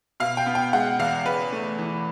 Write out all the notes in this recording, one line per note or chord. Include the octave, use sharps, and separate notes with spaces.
B2 F5
G5
B3
G5
G#3 F#5
E2 F5
C#3 B4
A3
E3